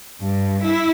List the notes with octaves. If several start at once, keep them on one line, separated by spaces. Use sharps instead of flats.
G2
E4